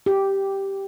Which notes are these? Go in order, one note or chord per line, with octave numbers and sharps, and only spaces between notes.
G4